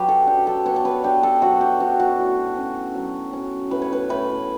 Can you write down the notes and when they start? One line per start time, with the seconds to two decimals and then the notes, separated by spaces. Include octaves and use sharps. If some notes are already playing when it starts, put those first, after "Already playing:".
Already playing: F#3 G4 B4 C#5
0.09 A4
0.27 D4 G4
0.47 A4
0.65 B3 C#5
0.76 A4
0.85 B4
1.03 D4 G4
1.23 A4
1.42 F#3 F#4
1.61 G4
1.80 D4 F#4
2.00 F#4
2.18 A2
2.57 C#4
2.95 F#3
3.33 C#4
3.71 A2 B4
3.82 C#5
3.93 B4
4.09 A2 B4